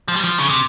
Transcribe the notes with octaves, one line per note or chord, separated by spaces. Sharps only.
F3
G3
F3
C#3
C3